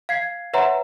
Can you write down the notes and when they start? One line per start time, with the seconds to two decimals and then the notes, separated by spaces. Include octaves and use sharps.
0.09 F5 G#6 C7
0.54 B4 C#5 E5 F#5 A#5 C6